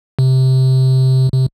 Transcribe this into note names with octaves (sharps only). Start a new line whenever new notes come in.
C3
C3